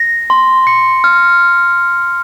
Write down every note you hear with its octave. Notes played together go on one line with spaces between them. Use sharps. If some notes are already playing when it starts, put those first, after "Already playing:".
Already playing: A#6
C6
C#7
F6